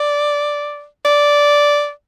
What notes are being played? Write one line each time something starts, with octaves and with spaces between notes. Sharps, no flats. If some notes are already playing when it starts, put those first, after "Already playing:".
Already playing: D5
D5